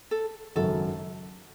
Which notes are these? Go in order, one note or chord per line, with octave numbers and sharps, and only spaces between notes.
A4
G#1 F#2 C#3 F#3 A4